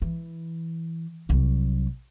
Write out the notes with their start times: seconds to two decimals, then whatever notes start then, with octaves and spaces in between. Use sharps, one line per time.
0.02 E3
1.29 C2 F#3